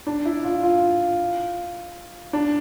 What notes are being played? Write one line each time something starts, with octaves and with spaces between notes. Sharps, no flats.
D4
E4
F4
F4
D4